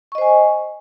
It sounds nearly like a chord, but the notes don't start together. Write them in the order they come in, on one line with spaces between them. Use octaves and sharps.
C#6 D#5 C5 G#5